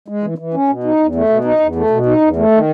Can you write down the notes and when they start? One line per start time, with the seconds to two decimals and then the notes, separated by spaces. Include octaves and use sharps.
0.08 G#3
0.23 E3
0.38 E3
0.54 C#4
0.68 B2
0.84 D#4
0.99 E2
1.15 A3
1.29 B2
1.44 D#4
1.60 E2
1.75 A3
1.90 B2
2.06 D#4
2.21 E2
2.36 A3
2.51 D#3